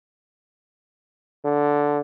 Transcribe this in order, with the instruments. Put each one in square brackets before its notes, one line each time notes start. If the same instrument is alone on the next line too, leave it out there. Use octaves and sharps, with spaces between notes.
[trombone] D3